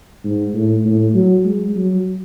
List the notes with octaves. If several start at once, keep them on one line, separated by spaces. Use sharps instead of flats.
G#2
A2
A2
F#3
G#3
F#3